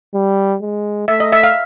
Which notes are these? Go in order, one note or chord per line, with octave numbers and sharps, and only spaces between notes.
G3
G#3
A3 E5
D#5
E5
F5